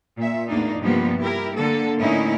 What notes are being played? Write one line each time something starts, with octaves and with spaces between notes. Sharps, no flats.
A#2 E5
E2 A2 A#3 D4 D#4
G2 C3 F3 G3 A#3 B3
E4 G4 A#4
D3 A#3 A4
A2 D3 A#3 C#4 D#4 E4